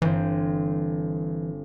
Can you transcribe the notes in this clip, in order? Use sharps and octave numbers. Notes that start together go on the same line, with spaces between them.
G1 E3 C4